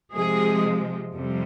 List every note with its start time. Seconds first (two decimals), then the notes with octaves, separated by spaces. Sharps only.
0.13 C3 F3 G#3 G#4
1.11 F2 C3 G3